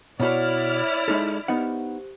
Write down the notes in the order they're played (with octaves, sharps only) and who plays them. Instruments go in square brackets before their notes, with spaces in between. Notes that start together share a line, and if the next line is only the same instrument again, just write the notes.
[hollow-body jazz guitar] B2 F#4 [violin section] E4 D5 F6 [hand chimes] C#5
[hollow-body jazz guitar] G#3 D#4 A4
[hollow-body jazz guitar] B3 D#4 F#5 [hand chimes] G4 C5